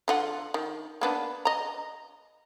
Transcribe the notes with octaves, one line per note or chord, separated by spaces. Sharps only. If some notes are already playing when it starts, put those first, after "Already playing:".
D3 F4 F#5
D#3
A#3 B3 D4
D#5 A#5